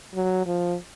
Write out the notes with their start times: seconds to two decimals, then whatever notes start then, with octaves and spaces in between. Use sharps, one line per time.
0.15 F#3
0.46 F3